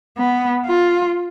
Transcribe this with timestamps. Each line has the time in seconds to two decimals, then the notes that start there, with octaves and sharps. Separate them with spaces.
0.18 B3
0.66 F4